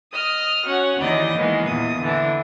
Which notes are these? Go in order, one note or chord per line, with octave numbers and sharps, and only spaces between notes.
D#5 D#6 F6
C#4 F#4 C#5 F#5
D#2 D#3 E3 D#4 D5 D#5
D#3 E3 G#3 A#3 B3
E2 A#2 D#6
D3 E3 D4